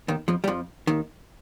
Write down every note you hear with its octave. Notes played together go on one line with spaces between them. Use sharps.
D#2 D#3
F2 F3
G3
F2 F3
D#2 D#3